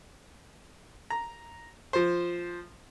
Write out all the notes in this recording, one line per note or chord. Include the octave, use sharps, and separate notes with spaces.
A#5
F3 C5